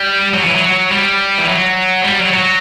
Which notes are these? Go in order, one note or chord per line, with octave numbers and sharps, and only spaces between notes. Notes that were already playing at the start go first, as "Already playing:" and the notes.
Already playing: G3
F#3
E3
F#3
G3
E3
F#3
G3
F#3
F#3